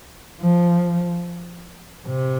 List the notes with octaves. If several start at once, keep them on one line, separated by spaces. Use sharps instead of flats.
F3
C3